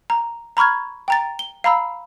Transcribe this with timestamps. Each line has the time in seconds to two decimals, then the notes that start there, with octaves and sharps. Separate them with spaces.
0.10 A#5
0.57 A#5 B5 C#6 F6 G#6
1.08 G5 A#5 A6
1.39 G7
1.64 F5 A#5 B5 E6